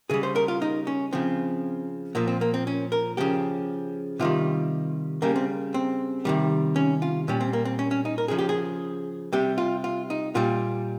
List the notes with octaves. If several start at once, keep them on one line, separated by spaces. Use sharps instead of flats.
C#3 G3 G#4
C5
A#4
F4
D#4
C#4
C#3 F3 C4
A#2 F3 A#3
C4
A#3
C4
C#4
A#4
C#3 F3 G4
C3 D#3 G3 F4
C#3 G3 A#3
C4
C4
C3 D#3 G3
C#4
F4
A#2 G3 C#4
C4
A#3
C4
C#4
C#4
D#4
A#4
C#3 F3 G#4
G4
G#4
C3 G3 G4
F4
F4
D#4
A#2 G3 F4